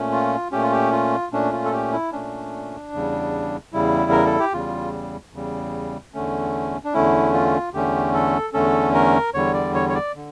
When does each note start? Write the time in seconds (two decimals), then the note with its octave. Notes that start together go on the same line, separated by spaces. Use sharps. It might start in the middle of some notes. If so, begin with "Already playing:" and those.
Already playing: A#2 A3 C#4
0.12 F4
0.52 A#2 A3 C#4 G4
0.62 F4
0.72 G4
0.92 F4
1.32 A#2 A3 C#4 D4
1.53 F4
1.65 A4
1.73 G4
1.92 E4
2.12 A#2 A3 C#4 D4
2.93 E2 C#3 G3
3.73 E2 C#3 G3 E4
4.11 A#4
4.25 A4
4.39 G4
4.53 E2 C#3 G3 F4
5.33 E2 C#3 G3
6.14 E2 D3 A3 C#4
6.84 D4
6.94 E2 D3 A3 C#4 E4
7.33 F4
7.74 E2 D3 A3 C#4 G4
8.14 A4
8.54 E2 D3 A3 C#4 A4
8.94 A#4
9.34 E2 D3 G3 C#5
9.54 D5
9.74 C#5
9.89 C#5
9.94 D5
10.16 D3